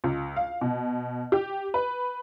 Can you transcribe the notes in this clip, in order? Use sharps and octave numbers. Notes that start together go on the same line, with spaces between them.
C#2
F5
B2
G4
B4